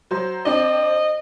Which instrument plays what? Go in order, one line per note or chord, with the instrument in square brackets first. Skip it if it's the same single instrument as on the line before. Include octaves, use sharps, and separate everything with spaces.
[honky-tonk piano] F#3 C5 C6
[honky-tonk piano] C4 D4 D5 [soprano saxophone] D#5